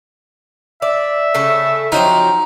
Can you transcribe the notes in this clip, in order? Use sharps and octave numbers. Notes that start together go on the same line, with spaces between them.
D5 E5
C#3 A3 A4
F3 F#3 C4 D#4